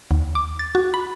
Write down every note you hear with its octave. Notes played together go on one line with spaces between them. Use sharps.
D#2
D6
A6
F#4
B5